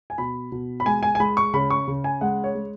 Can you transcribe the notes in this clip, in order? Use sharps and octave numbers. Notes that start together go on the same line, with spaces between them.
G#5
B2 B5
B2
B5
G#3 G#5
G#5
G#5
G#3 B5
C#6
C#3 B5
C#6
C#3
G#5
G#3 F#5
C#5
G#3